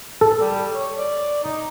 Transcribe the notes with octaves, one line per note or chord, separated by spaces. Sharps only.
A4
G3
C#5
D5
D#4